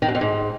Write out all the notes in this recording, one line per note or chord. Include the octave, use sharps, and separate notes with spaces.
D#3
F#2
F2
G#2